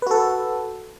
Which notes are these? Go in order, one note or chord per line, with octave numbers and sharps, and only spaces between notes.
F#4 A4 B4